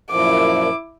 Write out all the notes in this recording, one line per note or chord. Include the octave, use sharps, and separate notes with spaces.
F#2 A#2 F3 E4 D6